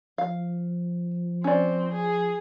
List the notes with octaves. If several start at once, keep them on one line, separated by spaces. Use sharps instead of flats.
F3 F5
C4 C#4 D5
G#4